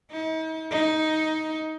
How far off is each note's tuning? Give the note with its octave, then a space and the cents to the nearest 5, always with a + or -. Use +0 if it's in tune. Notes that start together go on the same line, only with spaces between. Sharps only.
D#4 +45
D#4 +10